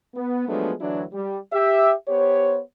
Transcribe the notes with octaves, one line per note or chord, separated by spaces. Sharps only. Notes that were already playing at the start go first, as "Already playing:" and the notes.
B3
F3 F#3 G#3 A3 B3 D4
D2 E3 F#3 D4 E4
G3
G4 E5
B3 G4 C5 C#5